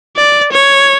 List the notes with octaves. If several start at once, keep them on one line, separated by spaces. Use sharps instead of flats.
D5
C#5